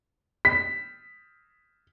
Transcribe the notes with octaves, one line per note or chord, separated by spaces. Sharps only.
B6